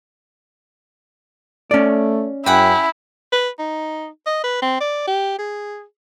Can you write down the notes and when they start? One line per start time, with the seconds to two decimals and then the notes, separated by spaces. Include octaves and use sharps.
1.71 A3 C#4 D5
2.46 F#2 E4 G#4 F#5 G5
3.32 B4
3.59 D#4
4.26 D#5
4.44 B4
4.62 C4
4.80 D5
5.07 G4
5.39 G#4